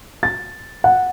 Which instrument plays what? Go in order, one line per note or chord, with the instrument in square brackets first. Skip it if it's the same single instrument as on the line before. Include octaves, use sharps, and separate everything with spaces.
[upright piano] A6
F#5